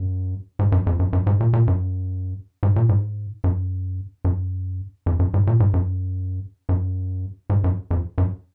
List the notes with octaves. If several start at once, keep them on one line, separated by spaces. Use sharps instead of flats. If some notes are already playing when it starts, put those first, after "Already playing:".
Already playing: F#2
G#2
F#2
F2
F#2
F#2
G#2
A#2
A#2
F#2
G#2
A#2
G#2
F#2
F#2
F2
F#2
G#2
A#2
G#2
F#2
F#2
G#2
F#2
F2
F#2